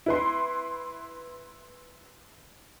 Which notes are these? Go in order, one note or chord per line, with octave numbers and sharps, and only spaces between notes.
E4 B4 C6